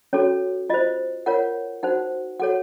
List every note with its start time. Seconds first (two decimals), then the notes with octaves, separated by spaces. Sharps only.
0.13 C#4 F#4 A4 C#5
0.70 F4 C5 D#5
1.26 F4 A#4 C#5 F#5
1.83 D#4 F#4 C5 F#5
2.40 F#4 A4 C#5 F#5